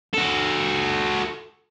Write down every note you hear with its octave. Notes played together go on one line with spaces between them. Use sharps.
F#4 A4